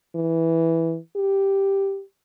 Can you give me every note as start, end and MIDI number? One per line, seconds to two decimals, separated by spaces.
0.15 0.97 52
1.16 2.02 67